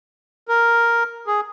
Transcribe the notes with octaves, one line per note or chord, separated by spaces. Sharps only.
A#4
G#4